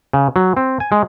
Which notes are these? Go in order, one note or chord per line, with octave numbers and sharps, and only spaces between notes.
C#3
F#3
C4
G#5
G#3